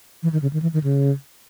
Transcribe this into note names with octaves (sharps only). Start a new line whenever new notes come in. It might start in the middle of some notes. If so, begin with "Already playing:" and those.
E3
D#3
C#3
D#3
E3
D#3
C#3